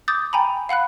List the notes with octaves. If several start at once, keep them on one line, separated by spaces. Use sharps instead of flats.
D6 D#6 G6 A6
G5 G#5 A#5 B5
F5 F#5 B5 F#6